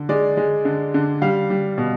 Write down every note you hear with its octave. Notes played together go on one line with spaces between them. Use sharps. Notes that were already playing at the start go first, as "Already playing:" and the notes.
Already playing: D3
G#3 D5
G#3
D3
D3
G3 F5
G3
B2